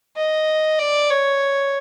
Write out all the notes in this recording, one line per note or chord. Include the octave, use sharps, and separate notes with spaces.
D#5
D5
C#5